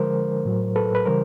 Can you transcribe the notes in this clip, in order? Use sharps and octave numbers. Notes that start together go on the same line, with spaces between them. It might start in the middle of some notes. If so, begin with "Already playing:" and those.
Already playing: D3 F3 G#3 A#4 C5
A2 F#3
A4 B4
B4
C#3 E3 G3 A#4 C5